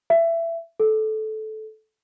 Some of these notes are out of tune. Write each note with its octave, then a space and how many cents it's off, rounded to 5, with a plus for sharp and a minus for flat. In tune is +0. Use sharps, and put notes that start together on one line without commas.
E5 +20
A4 -15